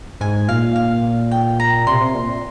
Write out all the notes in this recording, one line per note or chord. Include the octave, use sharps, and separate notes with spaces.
G#2 G#5
A#2 F5
F5
G5
A#5
C3 C6
C3
A#2